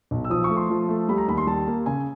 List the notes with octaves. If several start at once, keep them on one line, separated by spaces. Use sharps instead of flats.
B1
E6
F3 D#6
C#6
A3
C6
F3
A3
G3 B5
A#5
D#2 B5
C6
G3 A5
A#3
C#3 G#5